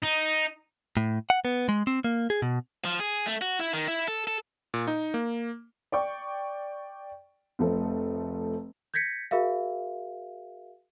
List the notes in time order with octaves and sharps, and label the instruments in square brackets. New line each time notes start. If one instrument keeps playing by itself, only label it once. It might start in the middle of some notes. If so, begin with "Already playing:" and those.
[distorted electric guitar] D#4
[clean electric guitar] A2
F#5
B3
G#3
C4
A#3
G#4
B2
[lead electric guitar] F3
G#4
A3
F#4
E4
D#3
E4
A4
A4
[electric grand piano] A#2
D#4
A#3
[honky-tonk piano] D5 G5 C#6
F1 F3 A3
[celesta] G6 G#6 A#6 B6 C#7
F#4 G#4 A#4 E5 F5